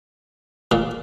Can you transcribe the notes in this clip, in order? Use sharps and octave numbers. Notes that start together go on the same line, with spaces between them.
A#2 A#3